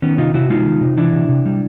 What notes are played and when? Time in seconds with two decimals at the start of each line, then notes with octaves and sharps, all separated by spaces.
0.02 D#3 B3 C#4
0.18 C3 D#4 F4
0.34 C3 E4 F#4
0.50 G#3 D#4 F4
0.65 D#3
0.81 C3
0.97 E3 D4 E4
1.13 C3
1.29 C3
1.46 G3